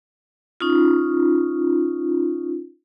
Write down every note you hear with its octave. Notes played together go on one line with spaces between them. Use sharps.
C#4 D#4 F4